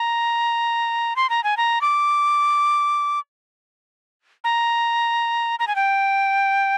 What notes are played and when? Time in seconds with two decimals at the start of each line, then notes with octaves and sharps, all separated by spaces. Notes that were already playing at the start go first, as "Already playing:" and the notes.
Already playing: A#5
1.16 C6
1.30 A#5
1.44 G#5
1.57 A#5
1.81 D6
4.44 A#5
5.59 A#5
5.67 G#5
5.76 G5